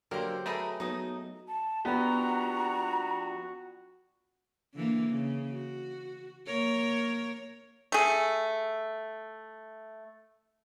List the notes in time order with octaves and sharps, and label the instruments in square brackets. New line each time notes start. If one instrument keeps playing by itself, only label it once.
[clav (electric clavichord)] D3 A#3 A#4 [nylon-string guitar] F#3 [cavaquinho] G4 C5
[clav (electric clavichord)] A3 G#4 B4 [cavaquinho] A#4 D#5 B5
[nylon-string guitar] F#3 B3 [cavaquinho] D#4 D#6
[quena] A5
[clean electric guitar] F3 D4 G4 [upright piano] B3 [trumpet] F#4 [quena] A#5
[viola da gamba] D3 E3 A#3
C#3
F#4
A#3 A#4 C#5
[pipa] A3 G#4